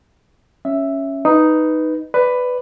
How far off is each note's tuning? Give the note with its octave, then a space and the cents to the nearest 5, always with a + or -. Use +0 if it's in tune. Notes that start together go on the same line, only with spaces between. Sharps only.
C#4 +0 E5 +0
D#4 +0 B4 +0
B4 +10 D5 +0